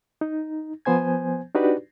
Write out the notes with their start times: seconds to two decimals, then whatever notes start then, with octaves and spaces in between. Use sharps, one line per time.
0.21 D#4
0.85 F3 B3 C5 G#5 G#6
1.55 D4 D#4 F#4 G4 B4 D5